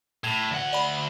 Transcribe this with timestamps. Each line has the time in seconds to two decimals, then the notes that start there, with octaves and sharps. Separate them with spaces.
0.24 A2 G#6
0.51 D2 F#5
0.73 D5 B5